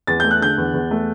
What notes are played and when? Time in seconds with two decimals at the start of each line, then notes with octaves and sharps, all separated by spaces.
0.07 E2 A6
0.20 A3 G6
0.31 F#6
0.41 D3 G6
0.58 E2
0.74 E2
0.91 A3